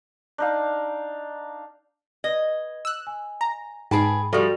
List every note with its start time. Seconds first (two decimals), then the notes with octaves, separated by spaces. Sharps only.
0.38 D4 D#4 F5
2.24 B4 D#5 G#6
2.85 E6 F#6
3.07 G#5
3.41 A#5
3.91 G#2 G#4 B4 G5 A5 B5 D7
4.33 F3 G3 F#4 A4 D5 E5 C#6